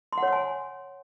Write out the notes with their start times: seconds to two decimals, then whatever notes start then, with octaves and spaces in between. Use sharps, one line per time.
0.13 C6
0.18 F#5
0.23 C#5
0.28 C6
0.33 G#5